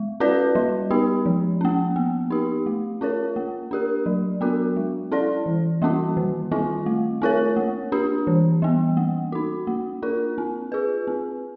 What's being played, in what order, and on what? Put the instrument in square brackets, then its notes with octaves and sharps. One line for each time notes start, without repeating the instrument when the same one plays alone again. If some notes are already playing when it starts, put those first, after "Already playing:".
Already playing: [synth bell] G#3
C#4 F#4 B4 D5
G3
B3 D#4 G4
F3
A#3 C#4
B3
D#4 G4
A3
C#4 F4 A#4 C#5
A#3
D4 G4 A#4
F#3
B3 D4 F#4 A#4
G#3
C#4 E4 A4 D5
E3
G3 A#3 C#4 F#4
D#3
G3 C4 F4
A3
C4 F4 A#4 C#5
A#3
D4 G4
E3
G3 B3
A#3
D#4 F#4
A#3
D4 F4 A#4
C4
F4 G#4 B4
C4